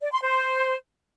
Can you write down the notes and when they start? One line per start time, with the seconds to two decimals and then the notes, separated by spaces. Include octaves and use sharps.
0.01 D5
0.11 C6
0.22 C5